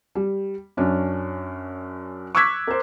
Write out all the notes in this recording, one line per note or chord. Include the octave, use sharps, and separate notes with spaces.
G3
F#2 C#4 D4
C#6 D6 E6 F#6 G#6 B6
A#4 C5